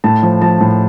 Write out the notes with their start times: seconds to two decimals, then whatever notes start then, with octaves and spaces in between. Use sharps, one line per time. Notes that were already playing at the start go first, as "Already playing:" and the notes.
0.04 A2 A5
0.23 F3
0.42 F3 A5
0.61 A2